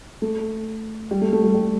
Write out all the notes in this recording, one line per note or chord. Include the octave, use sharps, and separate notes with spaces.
A3
G3
A3
A3
G3
G3